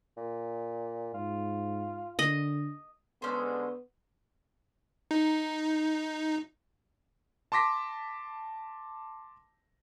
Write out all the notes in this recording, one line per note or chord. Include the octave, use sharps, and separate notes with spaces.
A#2
G#2 F4
D3 D#5
D3 G#3 B3 C#4 C5
D#4
A5 C6 D6 A#6 B6